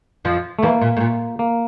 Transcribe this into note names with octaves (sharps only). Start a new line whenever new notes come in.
F2 F3
A3
E2 E3 A#3
A#2
A2
A#2
A#3